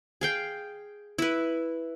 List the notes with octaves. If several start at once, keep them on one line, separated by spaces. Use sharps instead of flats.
G#4 F5 G5
E4 B4